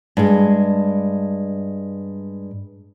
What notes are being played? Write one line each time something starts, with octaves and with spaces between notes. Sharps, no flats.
G2 G#3